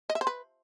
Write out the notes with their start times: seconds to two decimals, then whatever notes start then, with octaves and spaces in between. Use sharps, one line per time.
0.10 D#5
0.15 E5
0.21 C5
0.27 B4